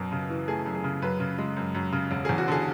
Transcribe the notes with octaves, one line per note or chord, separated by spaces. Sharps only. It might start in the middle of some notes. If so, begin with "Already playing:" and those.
Already playing: F#2 B2
C#3
E3
A3 G#4
F#2
G#4
C#3
F#2 B4
C#3
G#3
F#2
F#2
C#3
E1
E2 G#4
F#4
D3 G#4